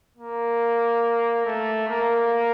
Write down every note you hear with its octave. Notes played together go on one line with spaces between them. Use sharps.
A#3
A3
A#3